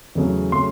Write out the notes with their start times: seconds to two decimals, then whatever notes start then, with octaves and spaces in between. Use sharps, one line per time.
0.15 E2 C#3 F#3 A3
0.52 C#3 F#3 A3 C6